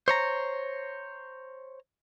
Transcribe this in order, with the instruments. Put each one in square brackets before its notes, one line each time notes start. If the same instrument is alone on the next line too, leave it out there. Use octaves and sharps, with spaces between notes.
[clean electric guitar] C5 C#5 A#5